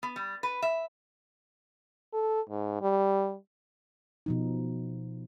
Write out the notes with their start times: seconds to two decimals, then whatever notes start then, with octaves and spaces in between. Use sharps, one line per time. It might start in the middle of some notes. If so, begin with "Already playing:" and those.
0.03 B3
0.16 G3
0.43 B4
0.62 E5
2.13 A4
2.49 G#2
2.82 G3
4.26 B2 F3 D#4